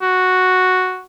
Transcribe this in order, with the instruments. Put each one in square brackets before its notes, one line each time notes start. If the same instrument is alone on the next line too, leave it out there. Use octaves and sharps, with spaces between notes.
[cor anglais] F#4